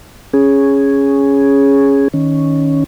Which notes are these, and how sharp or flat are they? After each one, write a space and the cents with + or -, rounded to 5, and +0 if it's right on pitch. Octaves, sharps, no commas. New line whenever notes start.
C#4 +0 G#4 +0
D#3 +0 C#4 +0